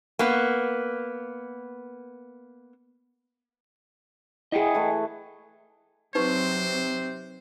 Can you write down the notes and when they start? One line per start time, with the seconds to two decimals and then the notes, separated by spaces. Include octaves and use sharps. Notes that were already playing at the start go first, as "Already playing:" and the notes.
0.19 A#3 B3
4.52 E4 G#4 D#5 F#5 G5
4.74 E3 A3
6.15 C3 F#3 C4 D#4 B4 C5 C#6